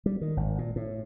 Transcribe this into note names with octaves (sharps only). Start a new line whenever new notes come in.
G3
D#3
G#1
A#2
A2